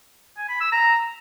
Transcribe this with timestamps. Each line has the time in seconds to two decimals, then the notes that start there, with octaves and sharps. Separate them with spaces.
0.37 G#5
0.49 B5
0.60 E6
0.72 A#5